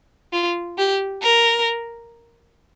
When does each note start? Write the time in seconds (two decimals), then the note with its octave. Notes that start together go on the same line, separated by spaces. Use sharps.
0.33 F4
0.78 G4
1.22 A#4